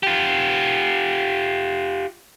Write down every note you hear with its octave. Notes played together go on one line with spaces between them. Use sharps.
F4 G4